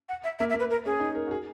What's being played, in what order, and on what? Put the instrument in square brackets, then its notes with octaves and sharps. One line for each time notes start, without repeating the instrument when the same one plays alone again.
[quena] F#5
E5
[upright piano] A#3 [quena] E5
[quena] E5
[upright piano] A#3
[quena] B4
A#4
[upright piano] C#4 [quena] G#4
[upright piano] D#4
A#4
F#4
G#4